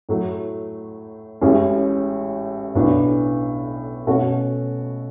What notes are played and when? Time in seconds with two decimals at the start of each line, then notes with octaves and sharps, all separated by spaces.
0.09 A2 F#3 A3
1.41 A1 A2 G#3 C#4 G#4
2.75 B1 A2 F#3 B3 D4
4.07 B2 A3 C#4 F#4 A4